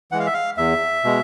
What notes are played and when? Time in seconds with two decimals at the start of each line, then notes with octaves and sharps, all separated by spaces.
0.12 E3 G#3 F#5
0.19 F5
0.27 E5
0.34 F5
0.57 E2 E5
1.04 B2 G#3